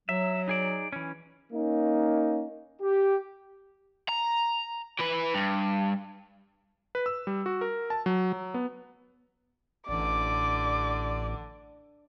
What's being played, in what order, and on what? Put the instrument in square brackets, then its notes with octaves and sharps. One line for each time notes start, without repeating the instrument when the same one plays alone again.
[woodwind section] F#3 [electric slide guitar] E5
[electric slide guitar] D#4 G#4 D5
E3 C#4
[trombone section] A#3 C#4 D#4
[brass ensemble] G4
[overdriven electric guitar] A#5
E3 B4
G2
[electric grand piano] B4
E6
G3
F#4
A#4
A5
F#3
F#3
B3
[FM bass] A1 [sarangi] D3 [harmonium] D5 [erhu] D6